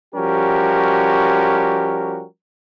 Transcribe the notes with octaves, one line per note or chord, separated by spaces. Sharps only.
F3 G3 C#4 F#4 G4 A#4